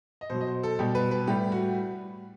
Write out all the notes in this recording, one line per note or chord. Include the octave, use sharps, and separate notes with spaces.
D#5
B2 F#3 C5
D#5
C5
A4
B2 G3 G4
B4
B4
A2 G3 G4
F#4